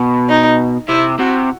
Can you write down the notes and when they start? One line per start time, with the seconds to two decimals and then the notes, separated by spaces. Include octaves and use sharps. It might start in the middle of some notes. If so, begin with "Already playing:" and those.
Already playing: B2
0.29 D#4
0.89 C3 E4
1.19 C3 F#4